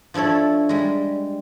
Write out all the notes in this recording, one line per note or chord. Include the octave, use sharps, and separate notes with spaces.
F3 D4 E4 A4 C#5
G3 G#3